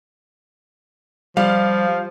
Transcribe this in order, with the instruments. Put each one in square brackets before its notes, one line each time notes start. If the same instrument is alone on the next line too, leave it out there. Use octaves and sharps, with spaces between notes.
[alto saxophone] F3 [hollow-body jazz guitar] G3 [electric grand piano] F5